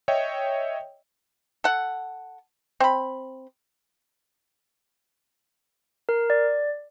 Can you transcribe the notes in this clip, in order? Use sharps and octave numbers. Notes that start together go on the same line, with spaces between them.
C#5 D#5 E5 G5
A4 F#5
C4 B5
A#4
D5